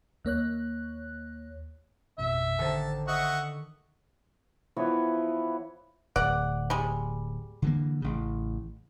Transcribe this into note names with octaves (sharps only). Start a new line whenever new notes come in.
D#2 A#3 C#5 F#6
A1 F2 B2 E5
A1 D3 D#3 C5 A5
D#5 E5 F#5 C#6
E3 F3 B3 C#5
D1 D5 F#5
G3 G#3
D3 E3 A#3
A1 C#3